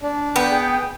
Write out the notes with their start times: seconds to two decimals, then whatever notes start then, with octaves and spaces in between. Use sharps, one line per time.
0.01 D4
0.36 B3 G5
0.51 G#4